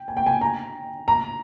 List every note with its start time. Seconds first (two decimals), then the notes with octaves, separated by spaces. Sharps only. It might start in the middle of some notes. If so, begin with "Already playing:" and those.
Already playing: G5
0.08 G#5
0.17 G5
0.26 G#5
0.41 A#5
1.08 A#5